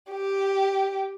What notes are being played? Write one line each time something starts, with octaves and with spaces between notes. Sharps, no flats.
G4